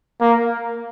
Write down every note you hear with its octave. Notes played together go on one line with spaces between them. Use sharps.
A#3